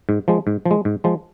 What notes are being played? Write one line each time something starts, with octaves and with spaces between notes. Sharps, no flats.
G#2
F3 G#3
G#2
F3
G#3
G#2
F3 G#3